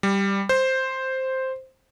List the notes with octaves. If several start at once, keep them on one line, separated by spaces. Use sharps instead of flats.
G3
C5